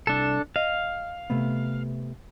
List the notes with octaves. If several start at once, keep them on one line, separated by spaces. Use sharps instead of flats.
C2 D4 A4
D#5 F5
C3 A3 B3